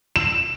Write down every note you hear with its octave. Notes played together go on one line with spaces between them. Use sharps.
E7